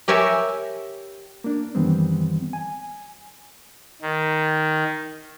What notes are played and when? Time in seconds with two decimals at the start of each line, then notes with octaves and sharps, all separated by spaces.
0.08 G4 A#4 C#5 E5 G#5
1.44 A#3 D4
1.75 F#2 D#3 E3 G3 B3 C4
2.53 G#5
4.02 D#3